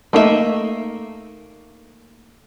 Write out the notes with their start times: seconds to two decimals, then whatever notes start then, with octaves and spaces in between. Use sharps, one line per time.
0.13 A3 A#3 D#4 G#4 E5